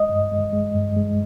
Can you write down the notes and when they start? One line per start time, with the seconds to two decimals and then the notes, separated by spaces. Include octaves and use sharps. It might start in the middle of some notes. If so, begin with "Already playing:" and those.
Already playing: G#3 D#5
0.09 G2
0.32 G#3
0.52 G#3
0.75 G2
0.96 G#3